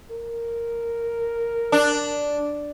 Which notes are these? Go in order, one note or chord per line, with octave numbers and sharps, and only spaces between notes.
A#4
D4